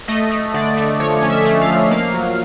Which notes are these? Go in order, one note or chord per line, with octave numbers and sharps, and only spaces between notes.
A3 D#5
A3
D3 D5
A3
F3 C#5
C#4
E5
A3
F5
F3
A#3 F5
F#3